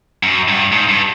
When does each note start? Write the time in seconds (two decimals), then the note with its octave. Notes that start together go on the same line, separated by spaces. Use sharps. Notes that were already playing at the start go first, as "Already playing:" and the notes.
0.23 F#2
0.48 G2
0.72 G#2
0.89 G2